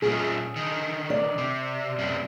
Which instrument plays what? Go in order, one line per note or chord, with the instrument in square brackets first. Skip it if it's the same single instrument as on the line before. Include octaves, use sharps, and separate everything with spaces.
[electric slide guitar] A#2 C#4 F4 [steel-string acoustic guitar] G#4
[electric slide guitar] D3 D#3
[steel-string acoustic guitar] D5
[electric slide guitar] C3
F#2 C3 C#4